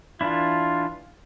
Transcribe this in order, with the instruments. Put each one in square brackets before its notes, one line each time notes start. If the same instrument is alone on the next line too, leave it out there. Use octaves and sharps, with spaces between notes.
[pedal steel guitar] E3 D4 E4 [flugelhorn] F4